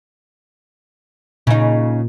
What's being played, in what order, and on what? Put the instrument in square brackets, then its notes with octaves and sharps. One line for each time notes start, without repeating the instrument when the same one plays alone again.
[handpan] A#2 [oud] C#3 D#4